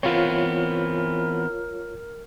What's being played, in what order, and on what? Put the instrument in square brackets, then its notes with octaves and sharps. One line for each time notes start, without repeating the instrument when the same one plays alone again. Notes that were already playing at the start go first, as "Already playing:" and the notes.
[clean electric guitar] E3 B3 C4 [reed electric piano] F4 C#5 [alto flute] A#4